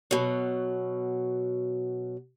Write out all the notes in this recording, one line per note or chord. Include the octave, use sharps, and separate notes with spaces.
B2 F#3